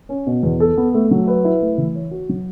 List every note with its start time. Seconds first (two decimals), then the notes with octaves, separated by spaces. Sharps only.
0.09 C#4
0.27 B2
0.43 E2
0.60 A4
0.77 B3
0.94 A3
1.11 F#3
1.27 B4
1.44 E4
1.62 A3
1.78 E3
1.95 C#5
2.11 F#4
2.29 F#3